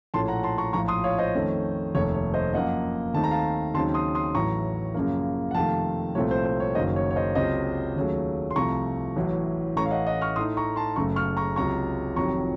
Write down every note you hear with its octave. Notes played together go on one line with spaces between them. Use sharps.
A#1 A2 A3 C#4 A5 C6
F#5 A#5
A5 C6
A#5 C#6
A#1 A2 F3 A#5 C#6
C6 D#6
C#5 F5
C5 D#5
F2 D#3 A3 C#4
F1 D#2 D#3 A3 C#5
C#5
C5 D#5
F#2 F3 A#3 D#5 F#5
D#2 D#3 A3 C4 D#4 A5
A#5
F5 A5
D#2 C#3 F#3 C4 D#4 A5 C6
C6 D#6
C6 D#6
A1 A2 F#3 A#5 C#6
F#2 C#3 F3 A#3
F#5
F2 C3 D#3 A3 F5 A5
C2 A#2 F3 A3 C4 C#5
C5
C5
C#5
F#1 F#2 D#3 F#3 A#3 C5 D#5
C#5
C#5
C5 D#5
C#2 C3 F#3 C5 D#5
D#2 C#3 F#3 A3
C6
C2 C3 F3 A3 A#5 C#6
A1 A2 F#3
A1 A2 A3 C#4 A#5 C#6
F5
D#5 F#5
D#5 F#5
C#6 F6
A2 A3 D#4 C6 D#6
A#5 C#6
A5 C6
F#1 F#2 C#3 A3 A#5 C#6
C#6 F6
A#5 C#6
C#2 C3 F#3 A#5 C#6
F1 F2 C3 D#3 F#3 A#5 C#6